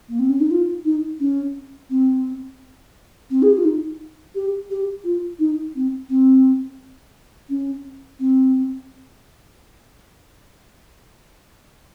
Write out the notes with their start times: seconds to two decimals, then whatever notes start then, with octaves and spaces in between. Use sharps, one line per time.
0.08 A#3
0.19 C4
0.29 C#4
0.40 D#4
0.50 F4
0.84 D#4
1.20 C#4
1.89 C4
3.30 C4
3.42 G#4
3.50 G4
3.58 F4
3.64 D#4
4.35 G4
4.70 G4
5.04 F4
5.39 D#4
5.75 C4
6.09 C4
7.49 C#4
8.19 C4